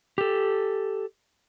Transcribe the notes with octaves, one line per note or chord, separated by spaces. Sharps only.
G4 A4